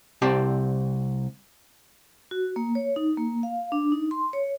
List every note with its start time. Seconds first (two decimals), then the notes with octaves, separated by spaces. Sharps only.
0.22 C2 C4 G4 D5 A5
2.31 F#4
2.56 A#3
2.75 C#5
2.96 D#4
3.18 A#3
3.43 F5
3.72 D4
3.92 D#4
4.11 C6
4.33 C#5